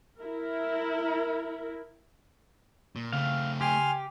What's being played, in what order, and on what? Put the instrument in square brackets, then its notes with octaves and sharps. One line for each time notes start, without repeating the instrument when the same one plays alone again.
[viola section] E4 A#4
[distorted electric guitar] A#2
[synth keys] C#3 [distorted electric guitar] A3 C4 [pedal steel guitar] F5
[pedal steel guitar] G4 [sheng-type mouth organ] G#5 C6 F6